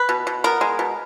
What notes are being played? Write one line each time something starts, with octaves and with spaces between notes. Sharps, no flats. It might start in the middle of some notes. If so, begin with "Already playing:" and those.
Already playing: B4
B2
B2
B3 A#4
G#3
B2